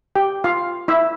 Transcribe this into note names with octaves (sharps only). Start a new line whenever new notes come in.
G4 G5
F4 F5
E4 E5